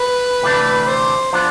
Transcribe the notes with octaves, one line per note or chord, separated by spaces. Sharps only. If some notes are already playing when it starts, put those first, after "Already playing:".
Already playing: B4
D2 C3 E3 A3 D4
C5
F3 B3 D4 C5